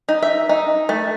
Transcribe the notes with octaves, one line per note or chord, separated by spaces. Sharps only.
D#4
E5
D#4
A3